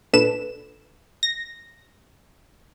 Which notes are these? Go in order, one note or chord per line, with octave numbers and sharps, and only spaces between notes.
A#2 D4 A4 B4 E7
A#6